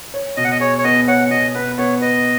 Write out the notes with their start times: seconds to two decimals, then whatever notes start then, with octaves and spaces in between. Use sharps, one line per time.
0.14 C#5
0.37 B2 D#5
0.44 F#5
0.51 D#5
0.60 G#4 C#5
0.78 C#5
0.84 B3 D#5
1.08 C#5 F#5
1.30 B2 D#5
1.55 B3 B4
1.78 B3 C#5
2.02 B4 D#5